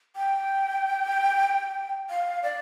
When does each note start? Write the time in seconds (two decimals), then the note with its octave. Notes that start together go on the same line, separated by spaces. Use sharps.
0.16 G5
2.10 F5
2.43 D5